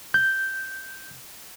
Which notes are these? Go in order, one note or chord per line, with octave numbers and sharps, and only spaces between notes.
G6